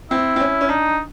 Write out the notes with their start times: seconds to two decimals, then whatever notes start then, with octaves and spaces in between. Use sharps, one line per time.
0.11 C4 E4
0.36 C4
0.40 C#4
0.61 C#4
0.69 D4 D#4